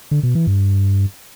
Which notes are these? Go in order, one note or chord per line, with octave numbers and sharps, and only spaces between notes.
D3
B2
E3
G2